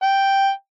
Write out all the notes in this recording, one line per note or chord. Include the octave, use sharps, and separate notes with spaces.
G5